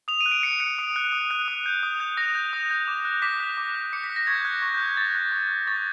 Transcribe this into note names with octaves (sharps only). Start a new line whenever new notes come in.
D#6 F7
D#7
F#6
D7
D#6 C#7
F#6 C#7
D#6
F#6
D#6
F#6
D#6
G6
D#6
G6
D#6 A#6
G6
D#6
G6
D6
F#6
D6 B6
F#6
D6
F#6
D6 C#7
B6
F#6
A#6
C#6 G#6
G6
F#6 G#6
C#6 G#6
G6
F#6
G6
C#6 A6
F#6
C#6
F#6
C#6 A6